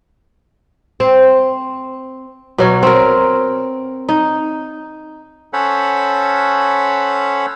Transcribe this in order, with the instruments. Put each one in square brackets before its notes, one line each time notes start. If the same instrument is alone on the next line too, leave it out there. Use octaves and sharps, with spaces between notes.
[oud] C4
[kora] B2 F#3 C#5
C4 A#4
D#4
[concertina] C#4 A4 C5 C#5 F#5 B5